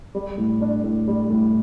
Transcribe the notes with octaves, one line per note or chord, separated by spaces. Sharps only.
G3
A2
D4
A2
G3
A2